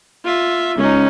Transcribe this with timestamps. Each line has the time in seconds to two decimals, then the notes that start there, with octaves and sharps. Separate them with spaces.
0.24 F4 E5
0.78 C#2 C#4 D#4